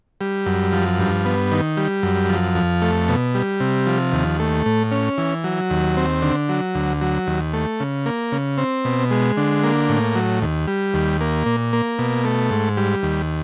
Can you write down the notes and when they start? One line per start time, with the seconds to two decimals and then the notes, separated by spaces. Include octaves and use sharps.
0.21 G3
0.46 F#2
0.73 F3
0.99 G2
1.25 B3
1.52 D#3
1.77 G3
2.03 F#2
2.29 F3
2.55 F2
2.82 A3
3.09 B2
3.35 G3
3.60 C3
3.87 F3
4.12 D#2
4.39 A3
4.66 A2
4.91 C#4
5.18 E3
5.44 F#3
5.70 D#2
5.97 C4
6.22 D3
6.49 F#3
6.75 D2
7.01 F#3
7.27 D#2
7.53 A3
7.80 C#3
8.06 A#3
8.32 C#3
8.58 C4
8.85 B2
9.11 G#3
9.37 D3
9.64 A#3
9.89 A2
10.15 F#3
10.42 D#2
10.68 G3
10.94 D#2
11.21 A#3
11.46 A#2
11.73 A#3
11.99 B2
12.25 A3
12.51 G#2
12.77 G3
13.03 D#2